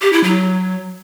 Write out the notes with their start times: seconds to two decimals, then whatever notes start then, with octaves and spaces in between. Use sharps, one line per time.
0.02 G4
0.13 E4
0.24 F#3